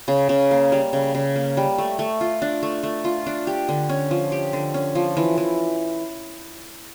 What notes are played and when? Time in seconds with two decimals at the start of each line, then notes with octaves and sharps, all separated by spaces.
0.08 C#3
0.29 C#3
0.51 A#3
0.72 G3
0.93 C#3
1.15 C#3
1.36 A#3
1.57 G3
1.78 A3
1.99 A3
2.21 F4
2.42 D4
2.63 A3
2.83 A3
3.05 F4
3.27 D4
3.47 G4
3.69 D3
3.89 C#4
4.11 F3
4.32 G4
4.53 D3
4.74 C#4
4.95 F3
5.17 E3
5.38 E3